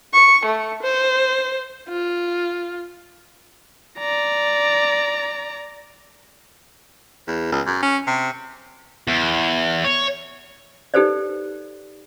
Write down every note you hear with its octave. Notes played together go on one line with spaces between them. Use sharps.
C#6
A3
C5
F4
D5 A#5
E2
C#2
F#2
C#4
C3
E2
C#5
D#4 G4 A4 B4 C5 D5